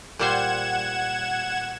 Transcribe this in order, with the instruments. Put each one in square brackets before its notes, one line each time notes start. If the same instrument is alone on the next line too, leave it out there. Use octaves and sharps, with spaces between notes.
[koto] A#2 G3 C5 [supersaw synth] F#5 G#6 E7